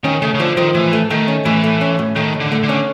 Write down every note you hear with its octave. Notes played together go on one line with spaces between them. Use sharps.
D#3 C#4
C#3 A3
C#3
D3 F3
D#3 F3
A2 E3
A3
D#3 A3
C#4
A2 E3
A3
C#4
A2
D#3 A3
A2
D3
A3
D3
C#4